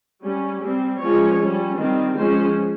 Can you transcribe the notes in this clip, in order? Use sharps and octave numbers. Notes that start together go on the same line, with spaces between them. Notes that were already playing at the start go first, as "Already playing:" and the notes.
G3 C#4
G3 C4
F3 G#3 C#4 C#5
G3 C#4
D#3 G3 C4
F3 G#3 C#4 C5